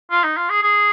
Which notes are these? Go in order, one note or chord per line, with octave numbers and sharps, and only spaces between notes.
F4
D#4
F4
G#4
G#4